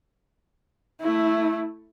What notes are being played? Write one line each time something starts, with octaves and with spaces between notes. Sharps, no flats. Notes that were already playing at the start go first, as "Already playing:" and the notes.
A3 E4